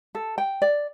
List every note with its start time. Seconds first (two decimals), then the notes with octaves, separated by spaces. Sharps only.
0.15 A4
0.38 G5
0.62 D5